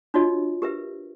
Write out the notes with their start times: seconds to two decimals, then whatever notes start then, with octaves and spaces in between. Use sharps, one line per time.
0.14 D4 F4 F#4 C#5 D#5
0.62 G4 A#4 B4 E5